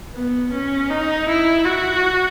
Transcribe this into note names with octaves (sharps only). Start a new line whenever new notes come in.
B3
C#4
D#4
E4
F#4